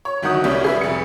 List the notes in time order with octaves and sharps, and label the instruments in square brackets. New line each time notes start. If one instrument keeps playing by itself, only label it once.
[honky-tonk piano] C#5
G1 D#3 F#3 F#5 D#6 G6
C2 G3 C#4
G#4 B4 E5
F1 C#7